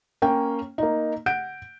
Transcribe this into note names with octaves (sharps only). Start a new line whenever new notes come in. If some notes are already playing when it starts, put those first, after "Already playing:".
A#3 C#4 G5
A#3 D#4
F#5 G6 D7